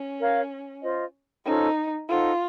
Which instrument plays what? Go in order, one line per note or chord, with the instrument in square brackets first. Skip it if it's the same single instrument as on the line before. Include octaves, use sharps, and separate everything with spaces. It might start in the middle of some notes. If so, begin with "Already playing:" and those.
Already playing: [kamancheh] C#4
[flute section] A#4 C#5 F5
F4 C5 D#5
[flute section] C#4 F4 A4 C5 [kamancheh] D#4
[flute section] D#4 A4 C5 F#5 [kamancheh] F4